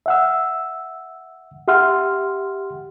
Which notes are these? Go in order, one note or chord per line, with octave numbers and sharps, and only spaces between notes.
E5 F#5 E6
G4 E5 F#5 C6 F6